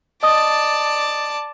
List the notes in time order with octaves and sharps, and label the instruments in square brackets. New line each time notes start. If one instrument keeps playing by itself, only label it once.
[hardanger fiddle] D5 A5 [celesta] D#5 D#6